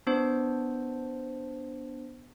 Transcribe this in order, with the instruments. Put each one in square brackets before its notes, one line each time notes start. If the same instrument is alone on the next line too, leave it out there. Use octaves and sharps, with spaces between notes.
[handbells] B3 D4 C5